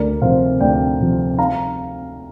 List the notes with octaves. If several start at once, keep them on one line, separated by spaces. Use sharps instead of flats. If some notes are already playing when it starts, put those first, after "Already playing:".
Already playing: D2 A#4 D5
C3 F3 C5 F5
D2 D5 G5
C3 F3
F5 A#5